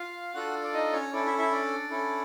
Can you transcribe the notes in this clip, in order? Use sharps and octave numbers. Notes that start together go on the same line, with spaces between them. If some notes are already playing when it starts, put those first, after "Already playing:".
Already playing: F4 F5
D4 F4 F#4 A4 F#5
D5
D#4 D#5
C#4 C#5
C#4 D4 E4 A4 D5
E4 E5
E4 E5
D4 D5
C#4 E4 A4